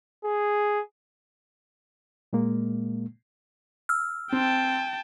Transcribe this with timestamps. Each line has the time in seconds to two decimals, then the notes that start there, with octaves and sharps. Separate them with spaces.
0.24 G#4
2.33 A#2 G#3 A#3
3.89 E6 F6
4.32 C4 G5 A5